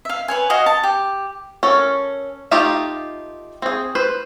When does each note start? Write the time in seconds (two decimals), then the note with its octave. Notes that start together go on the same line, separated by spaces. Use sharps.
0.05 E5 F5
0.28 B4 C#5 G#5
0.50 F#4 C#5 D#5 F5
0.66 A5
0.83 G4
1.63 C#4 A4 A#4
2.51 A3 D#4 F4 G4 A#5
3.62 C4 G#4
3.95 B4 C5